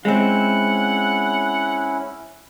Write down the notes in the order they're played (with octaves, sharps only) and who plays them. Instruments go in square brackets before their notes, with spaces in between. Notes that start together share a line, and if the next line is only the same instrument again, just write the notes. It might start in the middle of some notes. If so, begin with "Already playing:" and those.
[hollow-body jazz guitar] G#3 C4 [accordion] C#4 E4 [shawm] F#5